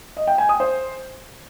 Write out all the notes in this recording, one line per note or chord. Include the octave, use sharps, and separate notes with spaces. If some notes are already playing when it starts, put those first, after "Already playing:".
D#5
G5
G#5
D#6
C5